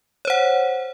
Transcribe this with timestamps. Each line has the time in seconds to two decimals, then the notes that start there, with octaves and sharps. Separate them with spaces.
0.25 C#5
0.27 C5
0.30 F#5